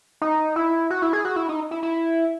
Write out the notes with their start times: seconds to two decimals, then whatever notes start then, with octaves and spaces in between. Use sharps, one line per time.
0.22 D#4
0.56 E4
0.90 F#4
1.02 E4
1.13 G#4
1.25 F#4
1.36 E4
1.49 D#4
1.71 E4
1.83 E4